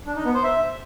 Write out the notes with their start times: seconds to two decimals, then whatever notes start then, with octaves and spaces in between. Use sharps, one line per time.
0.06 D4
0.16 D#4
0.25 B3
0.34 C5
0.44 E5